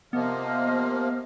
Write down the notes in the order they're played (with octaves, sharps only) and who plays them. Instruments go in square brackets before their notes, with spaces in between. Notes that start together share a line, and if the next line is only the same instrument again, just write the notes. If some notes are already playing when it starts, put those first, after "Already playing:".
[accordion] C3 F3 A#3 [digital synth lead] B3 [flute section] C5 D#5 F6